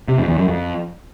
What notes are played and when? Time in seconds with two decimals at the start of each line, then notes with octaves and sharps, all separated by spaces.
0.08 C3
0.18 F2
0.28 E2
0.38 F#2
0.48 F2